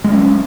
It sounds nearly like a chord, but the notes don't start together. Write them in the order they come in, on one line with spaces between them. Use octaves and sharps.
G#3 F#3 C#4